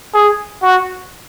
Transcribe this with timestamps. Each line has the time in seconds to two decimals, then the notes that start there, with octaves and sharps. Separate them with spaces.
0.14 G#4
0.62 F#4